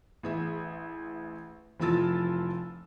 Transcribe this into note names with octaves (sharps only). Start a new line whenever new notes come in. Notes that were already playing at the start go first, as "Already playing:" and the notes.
A1 G#4 E5
F1 E3 F3 F4 E6 A6